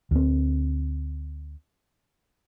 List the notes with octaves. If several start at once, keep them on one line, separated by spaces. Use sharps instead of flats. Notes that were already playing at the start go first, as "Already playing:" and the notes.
D2 C4